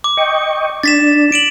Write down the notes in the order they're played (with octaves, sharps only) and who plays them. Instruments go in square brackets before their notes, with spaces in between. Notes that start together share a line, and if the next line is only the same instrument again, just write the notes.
[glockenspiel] D6
[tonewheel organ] D#5 G5 C#6
[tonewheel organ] D4 [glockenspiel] A6 B6 E7
[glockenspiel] D7 E7 F#7